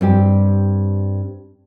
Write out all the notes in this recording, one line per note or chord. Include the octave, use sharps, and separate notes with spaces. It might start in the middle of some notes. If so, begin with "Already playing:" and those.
G2 C4 G4